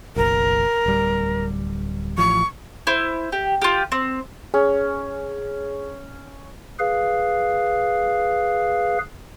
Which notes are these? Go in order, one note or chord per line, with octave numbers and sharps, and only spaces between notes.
F#1 B1 A#4
D1 G3
A1 F3 C#6
E4 C5
G4
F4 G4
C4
C#4 G#4
G#4 B4 F5